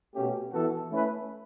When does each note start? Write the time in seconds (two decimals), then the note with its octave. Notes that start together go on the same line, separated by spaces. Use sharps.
0.14 B2 A3 C#4 G4
0.52 E3 B3 F#4 A4
0.90 A3 C#4 E4 B4